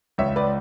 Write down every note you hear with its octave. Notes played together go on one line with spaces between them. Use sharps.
C#2 C#5 E5
B4 D5